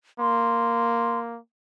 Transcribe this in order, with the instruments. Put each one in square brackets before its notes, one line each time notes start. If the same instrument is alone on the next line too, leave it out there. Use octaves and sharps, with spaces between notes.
[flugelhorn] A#3 [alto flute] C6